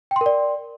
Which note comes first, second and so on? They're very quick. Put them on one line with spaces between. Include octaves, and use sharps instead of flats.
G5 C6 A#4 D5